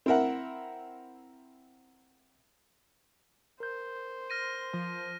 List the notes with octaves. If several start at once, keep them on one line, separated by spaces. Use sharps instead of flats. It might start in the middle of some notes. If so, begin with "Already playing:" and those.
C4 E4 A#4 E5 F#5
A#4 C5 G6
F6 A#6 D#7
F3